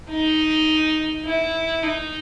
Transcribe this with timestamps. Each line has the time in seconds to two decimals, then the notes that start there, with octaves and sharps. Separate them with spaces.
0.10 D#4
1.26 E4
1.84 D#4